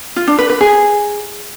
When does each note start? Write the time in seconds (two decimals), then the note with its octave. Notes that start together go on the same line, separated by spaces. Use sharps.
0.16 F4
0.27 D4
0.39 B4
0.50 B4
0.61 G#4